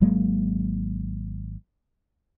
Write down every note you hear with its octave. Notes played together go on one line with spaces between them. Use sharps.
G#1 F#3 G#3 A#3